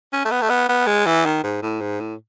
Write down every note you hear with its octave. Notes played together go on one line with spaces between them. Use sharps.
C#4
A3
B3
A3
B3
B3
G#3
E3
D#3
G#2
A2
G#2
A2